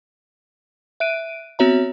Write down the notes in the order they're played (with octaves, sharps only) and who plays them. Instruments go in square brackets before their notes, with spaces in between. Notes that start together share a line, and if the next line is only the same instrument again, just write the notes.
[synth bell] E5 F#6 D7 D#7
B3 C4 F#4 C#5 E5 A#5